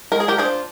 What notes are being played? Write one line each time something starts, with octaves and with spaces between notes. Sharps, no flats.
G#3 A#4
G#4
G4 A#4
D4 F4 G#4 C5